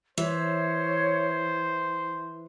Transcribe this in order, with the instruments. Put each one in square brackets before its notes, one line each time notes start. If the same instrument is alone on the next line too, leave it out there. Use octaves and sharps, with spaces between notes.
[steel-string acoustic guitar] E3 [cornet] C5 [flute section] C#5